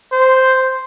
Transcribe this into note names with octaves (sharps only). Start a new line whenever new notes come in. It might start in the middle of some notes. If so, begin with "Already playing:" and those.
C5